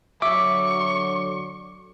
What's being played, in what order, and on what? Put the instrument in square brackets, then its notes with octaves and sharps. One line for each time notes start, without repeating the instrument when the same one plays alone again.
[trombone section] D3 F#3 [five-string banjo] E5 [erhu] C#6 [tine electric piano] D6